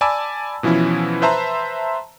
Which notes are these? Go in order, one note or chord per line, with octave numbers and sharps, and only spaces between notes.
D5 G#5 A5 B5 D6 E6
B2 E3 F3 C#4 E4
B4 C5 E5 A5 A#5 C6